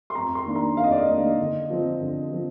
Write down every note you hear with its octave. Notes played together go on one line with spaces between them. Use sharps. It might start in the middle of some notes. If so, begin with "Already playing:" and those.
C6
F2 A#5
C6
D#3 A#3 D4
A#5
F2 F5
D#5
D5
D#5
D#3 A#3 D4
D3
F3 C4
D3
F3 C4